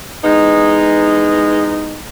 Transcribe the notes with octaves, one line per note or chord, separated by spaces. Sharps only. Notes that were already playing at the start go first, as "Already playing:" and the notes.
E3 G#3 B3 D#4